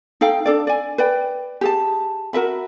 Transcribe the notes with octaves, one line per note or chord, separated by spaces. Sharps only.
D#4 A4 F5 G5
D4 A4 D5
D5 G#5
B4 D5 G5
G4 G#4 A5
F#4 A#4 E5 B5